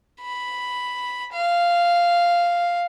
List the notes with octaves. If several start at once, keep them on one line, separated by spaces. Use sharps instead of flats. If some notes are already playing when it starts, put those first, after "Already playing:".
B5
F5